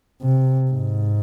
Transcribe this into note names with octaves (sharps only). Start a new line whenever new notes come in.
C3
G#2